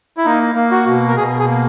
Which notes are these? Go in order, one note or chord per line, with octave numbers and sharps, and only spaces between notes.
E4
A#3 D#4
A#3
F#4
B2
A#4
B2 G#4
G#4
A#3